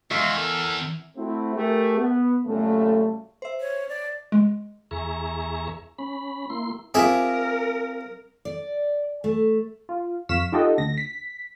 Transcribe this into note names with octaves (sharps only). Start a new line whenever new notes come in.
E2 G#3 E5 F5 C#6
A4 A#4
A3 C4 E4 F#4
A3 G4 G#4 A#4
B3
F#2 A#2 C#3 G3 A3
C5 E5
C#5
D5
G#3
E2 G#4 E5 A#5 C#6
C#4 B5
A#3 E4 C6
C4 F4 G4 G#4 A#4 E5
D5
A3
F4
F2 F5 C#6 B6 E7
D#4 F4 G4 A4 D#5 F#5
D2 A#6
B6